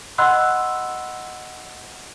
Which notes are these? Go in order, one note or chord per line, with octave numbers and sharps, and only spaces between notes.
D#5 F#5 B5 C6 E6 F#6